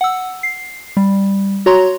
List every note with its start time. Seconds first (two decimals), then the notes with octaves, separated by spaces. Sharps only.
0.01 F#5 E6
0.43 C7
0.97 G3
1.66 F#4 C#5 A#5 C6